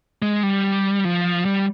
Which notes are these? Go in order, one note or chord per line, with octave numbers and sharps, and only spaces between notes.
G#3
G3
F3
G3